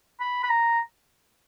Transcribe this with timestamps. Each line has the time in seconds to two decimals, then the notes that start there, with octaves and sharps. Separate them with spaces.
0.20 B5
0.43 B5
0.49 A#5